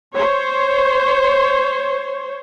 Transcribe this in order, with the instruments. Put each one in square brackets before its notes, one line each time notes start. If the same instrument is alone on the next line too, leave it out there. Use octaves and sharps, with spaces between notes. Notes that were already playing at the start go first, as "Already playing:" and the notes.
[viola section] C5 C#5